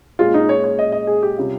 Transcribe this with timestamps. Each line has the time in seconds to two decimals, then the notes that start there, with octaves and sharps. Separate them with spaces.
0.19 A#2 G#3 C#4 F4 G#4
0.34 D#4
0.49 C#5
0.64 C#5
0.79 D#5
0.92 D#5
1.07 G#4
1.23 G4
1.38 C3 G3 C#4 F4